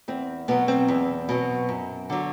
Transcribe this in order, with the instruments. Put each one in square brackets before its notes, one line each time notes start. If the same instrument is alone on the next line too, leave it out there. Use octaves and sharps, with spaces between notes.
[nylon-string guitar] E2 C4
B2 F#3 B3
C4
E2
B2 F#3
F#2
D3 F#3